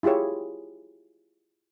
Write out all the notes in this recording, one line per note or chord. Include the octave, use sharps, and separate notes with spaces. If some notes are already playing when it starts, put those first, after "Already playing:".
E4 F4 G4 G#4 C#5